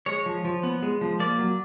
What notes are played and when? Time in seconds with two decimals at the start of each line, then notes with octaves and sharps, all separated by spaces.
0.06 G#3 C#5
0.26 F3
0.45 F3
0.63 B3
0.83 G#3
1.01 F3
1.20 A#3 D5
1.39 F#3